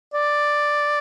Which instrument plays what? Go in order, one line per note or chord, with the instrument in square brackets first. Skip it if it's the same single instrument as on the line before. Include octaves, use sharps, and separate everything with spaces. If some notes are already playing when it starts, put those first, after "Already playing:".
[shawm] D5